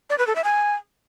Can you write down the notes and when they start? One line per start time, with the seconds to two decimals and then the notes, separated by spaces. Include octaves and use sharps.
0.10 D5
0.18 B4
0.27 A4
0.36 E5
0.44 G#5